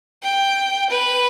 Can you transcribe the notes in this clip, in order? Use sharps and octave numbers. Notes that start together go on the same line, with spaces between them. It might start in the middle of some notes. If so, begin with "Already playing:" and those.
G5
B4